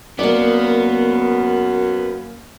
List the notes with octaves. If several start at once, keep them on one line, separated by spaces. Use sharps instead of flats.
F#2 A#3 B3 D5